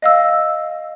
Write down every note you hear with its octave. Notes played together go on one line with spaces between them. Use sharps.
D#5 F5 E6